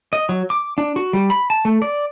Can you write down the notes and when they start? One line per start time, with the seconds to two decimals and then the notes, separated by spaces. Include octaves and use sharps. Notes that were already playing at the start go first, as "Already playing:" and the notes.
0.13 D#5
0.29 F#3
0.50 D6
0.78 D4
0.96 F#4
1.13 G3
1.30 B5
1.50 A5
1.65 A3
1.82 D5